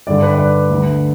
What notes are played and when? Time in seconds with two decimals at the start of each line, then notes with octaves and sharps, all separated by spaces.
0.07 G2 D3 D5
0.23 B4
0.34 D5
0.38 B4
0.70 D2 D3